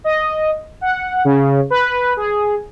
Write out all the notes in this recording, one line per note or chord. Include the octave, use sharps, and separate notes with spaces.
D#5
F#5
C#3
B4
G#4